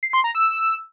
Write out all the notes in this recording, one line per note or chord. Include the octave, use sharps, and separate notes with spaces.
C7
C6
A#5
E6